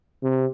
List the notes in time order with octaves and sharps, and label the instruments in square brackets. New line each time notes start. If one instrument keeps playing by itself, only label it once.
[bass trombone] C3